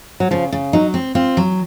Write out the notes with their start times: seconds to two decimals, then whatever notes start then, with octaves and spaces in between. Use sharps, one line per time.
0.20 F#3
0.31 C#3 F3
0.52 C#3
0.73 F#3 D#4
0.94 C4
1.15 C4 F4
1.37 F#3